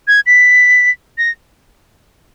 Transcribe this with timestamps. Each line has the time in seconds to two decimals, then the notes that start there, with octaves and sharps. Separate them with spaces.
0.07 G#6
0.26 B6
1.18 A#6